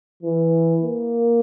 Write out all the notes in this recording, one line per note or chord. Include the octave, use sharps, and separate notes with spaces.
E3
A#3